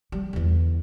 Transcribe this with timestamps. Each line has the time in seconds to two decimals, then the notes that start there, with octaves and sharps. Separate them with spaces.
0.12 G3
0.33 E2 D3